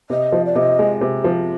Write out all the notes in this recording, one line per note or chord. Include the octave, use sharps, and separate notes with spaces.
C3 D#5
F3
D5
C3 D#5
G#3
C3
F3